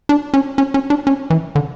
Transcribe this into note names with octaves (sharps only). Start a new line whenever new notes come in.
D4
C#4
C#4
C#4
D4
C#4
E3
D3